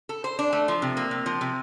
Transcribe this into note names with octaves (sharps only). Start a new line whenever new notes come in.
A4
C5
D4
A3
F3
C3
A#3
C3
F3
C3